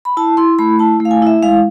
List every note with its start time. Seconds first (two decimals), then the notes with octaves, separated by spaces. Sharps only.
0.05 B5
0.17 E4 A5
0.37 E4 C6
0.59 A3 B5
0.79 E4 A5
1.00 A3
1.05 F5
1.11 G#5
1.22 E4 E5
1.43 G#3 F5